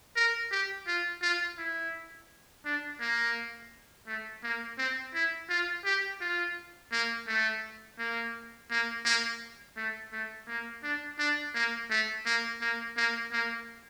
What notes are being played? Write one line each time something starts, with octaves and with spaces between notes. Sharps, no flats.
A#4
G4
F4
F4
E4
D4
A#3
A3
A#3
C4
E4
F4
G4
F4
A#3
A3
A#3
A#3
A#3
A3
A3
A#3
D4
D4
A#3
A3
A#3
A#3
A#3
A#3